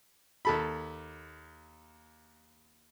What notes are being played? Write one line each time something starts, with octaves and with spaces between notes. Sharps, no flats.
D#2 A4 B5